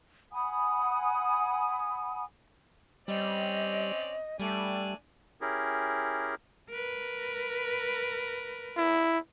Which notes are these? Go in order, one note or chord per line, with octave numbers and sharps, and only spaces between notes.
F#5 G#5 B5 D#6
G3 C4 C#4 D5 D#5
G3 A3 D4 D5 G#5
C#4 E4 G4 G#4 A#4
A#4 B4
E4